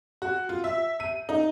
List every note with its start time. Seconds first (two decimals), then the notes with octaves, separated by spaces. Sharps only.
0.22 F#4
0.49 F4
0.64 E5
1.00 D#7
1.29 D#4